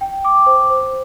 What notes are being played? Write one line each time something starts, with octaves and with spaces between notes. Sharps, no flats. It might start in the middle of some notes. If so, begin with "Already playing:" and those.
G5
D6
C5
C5